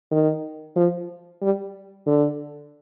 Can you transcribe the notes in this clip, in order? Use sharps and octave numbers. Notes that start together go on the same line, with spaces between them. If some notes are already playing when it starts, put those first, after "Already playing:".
D#3
F3
G3
D3